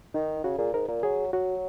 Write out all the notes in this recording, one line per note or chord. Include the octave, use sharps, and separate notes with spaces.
D#3 D#4
C#3 F#4
A#2 G#4
G#2 A#4
A#2 A#4
F#3 G#4
F#3 F#4